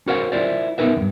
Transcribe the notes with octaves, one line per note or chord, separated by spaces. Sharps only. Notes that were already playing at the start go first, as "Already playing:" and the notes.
F#4 A#4 C5 C#5 F5 F#5
E4 F4 A#4 C5 D5
B3 D#4 A#4 B4 E5
E2 G2